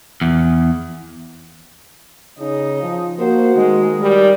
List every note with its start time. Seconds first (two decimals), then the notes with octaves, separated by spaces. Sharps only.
0.21 E2
2.40 C#3 D#4
2.83 F3
3.19 A#3 F#4 C5
3.56 D#3 G#3
4.01 G3 A#4